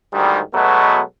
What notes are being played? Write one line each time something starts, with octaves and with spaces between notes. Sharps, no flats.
D2 G#2 D#3 G3
B2 F#3 G#3 A3 B3